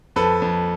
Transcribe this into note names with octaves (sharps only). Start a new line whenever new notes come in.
F2 A4 B4
F2